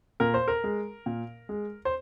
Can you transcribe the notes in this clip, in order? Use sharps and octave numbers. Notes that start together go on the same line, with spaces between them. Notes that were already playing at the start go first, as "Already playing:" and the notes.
A#2 A#4
C5
A#4
G#3
A#2
G#3
C5